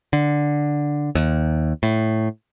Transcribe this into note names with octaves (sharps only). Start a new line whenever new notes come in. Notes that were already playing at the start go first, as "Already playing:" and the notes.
D3
D#2
A2